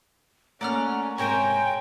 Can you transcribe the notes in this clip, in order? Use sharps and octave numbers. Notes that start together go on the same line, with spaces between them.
A3 A#3 C#4 D5 F#5 A#5 F6
G#2 C3 A#4 C5 C#5 G5 G#5